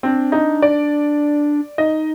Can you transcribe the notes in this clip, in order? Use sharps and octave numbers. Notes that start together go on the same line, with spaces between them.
C4 D4
D#4
D5
D#4 D#5